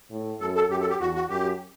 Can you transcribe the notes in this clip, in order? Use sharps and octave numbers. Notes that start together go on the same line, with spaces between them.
A2
F#2 A4
A4
F#2 G4
A4
G4
E2 F#4
F#4
F#2 G4